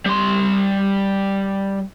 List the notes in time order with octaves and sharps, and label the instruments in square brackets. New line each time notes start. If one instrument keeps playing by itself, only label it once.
[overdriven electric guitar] G3 C6